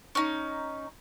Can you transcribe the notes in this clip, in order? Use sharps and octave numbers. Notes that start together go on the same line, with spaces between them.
C#4 D#4